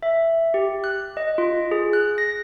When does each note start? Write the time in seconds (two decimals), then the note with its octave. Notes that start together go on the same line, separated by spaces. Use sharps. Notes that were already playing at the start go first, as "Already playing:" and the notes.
0.03 E5
0.54 G4
0.84 F#6
1.17 D#5
1.38 F4
1.71 G#4
1.93 F#6
2.18 A#6